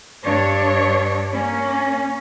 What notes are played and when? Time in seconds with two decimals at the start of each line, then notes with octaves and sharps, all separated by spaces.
0.24 G2 D4 C#5
1.33 A#3 C#4